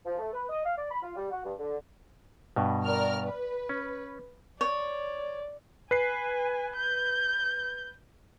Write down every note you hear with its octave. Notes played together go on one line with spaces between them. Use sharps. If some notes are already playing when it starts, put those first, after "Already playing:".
F3
A3
B4
D#5
F5
D5
B5
F4
G3
F#4
G2
D3
G2 B2
A#4 D5 F6
B4
C#4
C#5 D5
B4 G#5 C7
G6